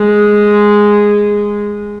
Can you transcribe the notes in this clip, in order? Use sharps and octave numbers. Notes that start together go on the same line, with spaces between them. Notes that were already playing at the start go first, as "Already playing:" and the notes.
Already playing: G#3